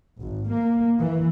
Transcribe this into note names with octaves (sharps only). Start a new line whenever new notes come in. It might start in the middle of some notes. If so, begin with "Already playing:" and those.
G#1
A#3
E3